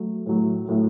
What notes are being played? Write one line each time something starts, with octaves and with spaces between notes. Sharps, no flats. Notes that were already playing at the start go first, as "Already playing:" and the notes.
Already playing: F#3 A3
A2 F#3 A3
A2 F#3 A3